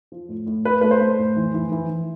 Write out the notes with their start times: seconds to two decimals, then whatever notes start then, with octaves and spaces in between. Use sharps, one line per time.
0.12 F3
0.29 A2
0.46 A2
0.65 A2 B4
0.81 A3 B4
0.91 C5
1.01 A3
1.18 A2
1.37 E3
1.54 E3
1.72 E3
1.90 E3